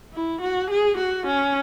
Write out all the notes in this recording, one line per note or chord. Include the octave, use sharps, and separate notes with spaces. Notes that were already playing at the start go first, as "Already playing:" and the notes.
E4
F#4
G#4
F#4
C#4